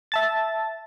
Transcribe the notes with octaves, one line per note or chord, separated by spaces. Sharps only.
E5 A5 A6